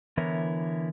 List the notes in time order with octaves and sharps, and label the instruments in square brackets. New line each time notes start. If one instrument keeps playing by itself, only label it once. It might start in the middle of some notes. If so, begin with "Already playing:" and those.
[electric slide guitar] D3 E3 B3 E4 A#4 C#5